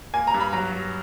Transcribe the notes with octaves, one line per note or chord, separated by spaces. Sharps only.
A#3 G#5
A#5
G2
B5
F#3 A#5
F#3